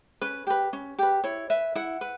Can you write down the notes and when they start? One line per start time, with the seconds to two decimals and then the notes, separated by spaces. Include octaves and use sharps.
0.21 C#4 B4
0.47 G4 B4
0.73 C#4
0.99 G4 B4
1.24 E4 C#5
1.50 B4 E5
1.75 E4 F#5
2.01 B4